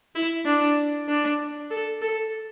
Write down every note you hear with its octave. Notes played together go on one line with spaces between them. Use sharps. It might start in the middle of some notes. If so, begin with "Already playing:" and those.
E4
D4
D4
A4
A4